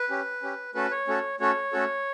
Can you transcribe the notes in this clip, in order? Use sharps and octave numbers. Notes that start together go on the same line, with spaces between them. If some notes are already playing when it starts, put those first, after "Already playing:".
Already playing: B4
C#4 G4
C#4 G4
A3 C#4 F#4 A4 B4
C#5
A3 C#4 F#4 A4
A3 C#4 F#4 A4 C#5
A3 C#4 F#4 A4